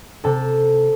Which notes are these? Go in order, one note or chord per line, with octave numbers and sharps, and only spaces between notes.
C3 A4 A5